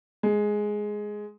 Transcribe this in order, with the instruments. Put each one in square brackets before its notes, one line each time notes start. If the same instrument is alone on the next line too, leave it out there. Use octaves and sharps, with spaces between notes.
[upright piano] G#3